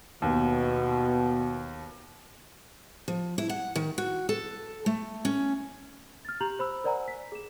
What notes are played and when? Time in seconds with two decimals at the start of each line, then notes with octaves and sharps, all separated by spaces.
0.22 D#2 B2 D#3 B3
3.08 F3
3.38 E4
3.49 F#5
3.76 D#3
3.98 F#4
4.29 A4
4.86 A3
5.25 C#4
6.25 F6 A6
6.41 G4 A#5 G6 F7 F#7
6.59 C5 B5 E6
6.84 A#4 C5 D5 F#5 G#5 A#5
7.08 B6
7.32 G#4 E7